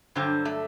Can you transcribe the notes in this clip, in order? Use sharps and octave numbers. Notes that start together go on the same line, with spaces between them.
G2 D3 F#3 C4
A3